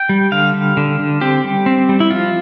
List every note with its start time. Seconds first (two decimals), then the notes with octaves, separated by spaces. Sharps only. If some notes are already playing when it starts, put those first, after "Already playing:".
Already playing: G5
0.09 G3
0.32 D3 F5
0.54 G3
0.77 D3
1.00 D3
1.21 C4 G4
1.44 G3
1.66 C4
1.89 G3
2.00 E4
2.10 F3 F4